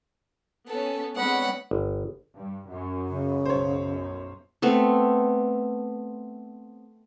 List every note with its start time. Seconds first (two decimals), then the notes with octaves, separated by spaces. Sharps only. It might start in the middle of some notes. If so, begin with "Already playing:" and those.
0.69 B3 C#4 A4
1.16 G#3 B3 C4 D4 C#5 F#5 B5
1.71 G1
2.36 G2
2.69 F#2
3.08 C#3
3.45 B1 F#2 C5 C#5
4.62 A3 B3 C4